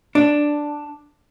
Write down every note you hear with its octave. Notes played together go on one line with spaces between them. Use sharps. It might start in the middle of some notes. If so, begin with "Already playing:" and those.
D4